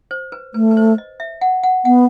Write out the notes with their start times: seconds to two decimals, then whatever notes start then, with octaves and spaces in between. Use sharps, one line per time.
0.11 C5
0.32 B4
0.54 A3 B4
0.71 B4
0.77 C5
0.98 D#5
1.20 E5
1.41 F#5
1.63 F#5
1.85 B3 F#5